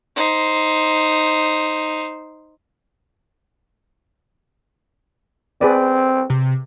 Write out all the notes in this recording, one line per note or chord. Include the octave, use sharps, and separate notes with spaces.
D#4 C5
C4 G#4 B4 D5
C3